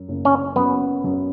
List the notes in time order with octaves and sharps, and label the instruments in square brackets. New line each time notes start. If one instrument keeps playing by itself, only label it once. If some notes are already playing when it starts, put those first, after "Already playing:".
Already playing: [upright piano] F#2
F#1
[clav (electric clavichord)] C#4
[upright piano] F#2 [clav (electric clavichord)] B3
[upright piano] F#2